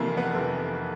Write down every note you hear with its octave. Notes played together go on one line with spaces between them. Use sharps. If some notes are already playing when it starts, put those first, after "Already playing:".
Already playing: F1 F2 C3 E3 A#3
B3
F1 F2 C3 E3